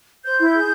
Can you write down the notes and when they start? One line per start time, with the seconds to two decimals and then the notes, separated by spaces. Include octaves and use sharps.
0.25 C5 G6
0.39 E4
0.54 G#4